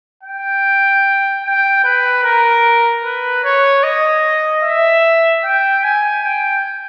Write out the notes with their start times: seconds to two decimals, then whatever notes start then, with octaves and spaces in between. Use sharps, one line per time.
0.23 G5
1.44 G5
1.84 B4
2.24 A#4
3.04 B4
3.44 C#5
3.83 D#5
4.64 E5
5.44 G5
5.84 G#5
6.24 G5